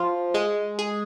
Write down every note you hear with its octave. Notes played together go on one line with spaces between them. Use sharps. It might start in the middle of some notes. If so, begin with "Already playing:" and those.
Already playing: F3 F4
G#3
G#4